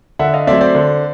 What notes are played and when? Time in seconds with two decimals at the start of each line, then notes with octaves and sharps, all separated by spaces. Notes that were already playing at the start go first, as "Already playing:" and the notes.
0.19 D3 E5 F#5
0.33 D#5 F5
0.47 F#3 A3 C4 D5 E5
0.61 C5 D5
0.75 D3